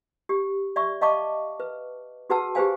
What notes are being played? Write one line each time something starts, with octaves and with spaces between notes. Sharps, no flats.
G4
D5 E5 C#6
D#5 F5 A5 C#6 D6
B4
F#4 G#4 B4 F#5 A5 E6
G4 G#4 B4 C5 F5 G#5